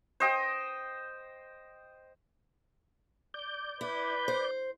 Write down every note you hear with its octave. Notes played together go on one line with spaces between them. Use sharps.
C5 D#5 G5
D5 G6
E4 B4
C5